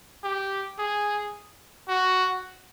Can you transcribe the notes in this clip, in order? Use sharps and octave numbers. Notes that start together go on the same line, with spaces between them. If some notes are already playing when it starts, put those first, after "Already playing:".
G4
G#4
F#4